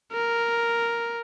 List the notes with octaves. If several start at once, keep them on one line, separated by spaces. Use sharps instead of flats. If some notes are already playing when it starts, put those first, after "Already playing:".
A#4